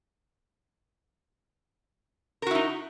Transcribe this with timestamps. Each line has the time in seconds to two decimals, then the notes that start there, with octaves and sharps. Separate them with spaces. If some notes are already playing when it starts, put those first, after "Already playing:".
2.42 A#4
2.47 F#4
2.51 E4
2.55 D#4